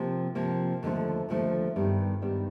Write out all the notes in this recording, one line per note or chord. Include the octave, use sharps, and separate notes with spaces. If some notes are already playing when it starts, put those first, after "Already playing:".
Already playing: C3 F3 A#3
C3 F3 A#3
D#2 D3 F3 A3
D#2 D3 F3 A3
G2 D#3 G3 B3
G2 D#3 G3 B3